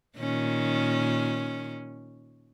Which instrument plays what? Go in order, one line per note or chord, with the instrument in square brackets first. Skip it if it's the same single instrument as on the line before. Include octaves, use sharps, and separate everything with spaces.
[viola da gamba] A#2 D#3 C#4